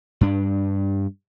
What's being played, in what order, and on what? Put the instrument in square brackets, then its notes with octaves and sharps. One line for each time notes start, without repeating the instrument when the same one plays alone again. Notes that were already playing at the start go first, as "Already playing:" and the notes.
[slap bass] G2 D4